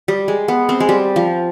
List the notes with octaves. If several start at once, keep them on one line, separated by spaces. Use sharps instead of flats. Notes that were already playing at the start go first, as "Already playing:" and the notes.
G3
G#3
B3
C4
G#3
G3
F3